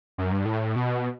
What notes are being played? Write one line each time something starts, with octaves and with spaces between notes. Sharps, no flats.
F#2
G2
A2
B2